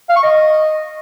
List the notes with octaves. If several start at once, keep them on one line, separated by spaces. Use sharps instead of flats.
F5
C#6
D#5